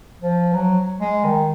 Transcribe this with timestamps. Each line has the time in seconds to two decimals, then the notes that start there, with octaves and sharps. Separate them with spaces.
0.22 F3
0.53 F#3
1.01 G#3
1.25 D#3